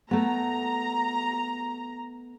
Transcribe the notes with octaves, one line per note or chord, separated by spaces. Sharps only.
A3 B3 A#5